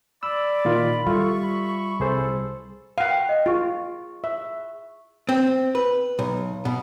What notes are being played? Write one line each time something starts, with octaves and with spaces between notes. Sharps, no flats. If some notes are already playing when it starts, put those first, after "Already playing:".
D5 B5 E6
A#2 D#3 F4
G3 F4 A4 E5 C#6
B5
C2 G#4 A4 C5
F5 F#5
G5
D#5
F4 G#4 C#6
E5
C4
B4
B1
B2